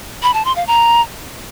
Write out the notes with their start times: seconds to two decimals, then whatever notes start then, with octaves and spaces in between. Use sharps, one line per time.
0.23 B5
0.34 A5
0.45 C6
0.56 F5
0.67 A#5